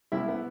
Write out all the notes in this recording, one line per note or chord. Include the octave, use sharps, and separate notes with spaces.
C2 E4 E5
B3